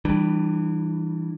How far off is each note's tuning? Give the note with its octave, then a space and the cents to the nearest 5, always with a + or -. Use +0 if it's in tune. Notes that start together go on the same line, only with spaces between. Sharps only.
E3 +0 G3 +0 D4 +35